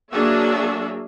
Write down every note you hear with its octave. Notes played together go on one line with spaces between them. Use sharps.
F#3 A#3 D4 F#4 G#4 E5